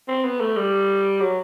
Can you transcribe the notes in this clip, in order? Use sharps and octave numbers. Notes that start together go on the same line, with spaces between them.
C4
B3
A3
G3
F#3